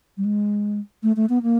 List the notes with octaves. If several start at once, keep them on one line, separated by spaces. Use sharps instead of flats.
G3
G#3
A3
A3
B3
A#3